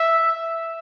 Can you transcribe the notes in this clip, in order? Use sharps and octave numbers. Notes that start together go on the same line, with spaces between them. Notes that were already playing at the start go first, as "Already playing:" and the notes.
Already playing: E5